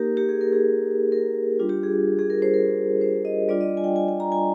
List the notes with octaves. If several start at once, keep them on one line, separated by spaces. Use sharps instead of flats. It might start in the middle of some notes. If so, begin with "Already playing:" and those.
Already playing: A#3 D#4 G4 A#4
G4
G#4
A#4
G#4
A#4
G3 D4 F4
G4
G#4
G#4
A#4
C5
A#4
C5
D#5
G3 D4 F4 D5
D#5
G#5
G5
G#5
G#5
A#5
G#5